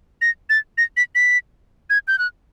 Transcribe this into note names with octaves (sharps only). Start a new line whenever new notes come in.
A#6
A6
A#6
B6
B6
G#6
G6
F#6